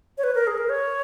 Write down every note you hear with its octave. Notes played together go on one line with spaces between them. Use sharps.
C#5
B4
A#4
G#4
A#4
C#5